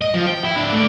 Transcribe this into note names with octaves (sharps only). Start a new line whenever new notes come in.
D#5
F3
G5
E4
D4 E4
A3 D5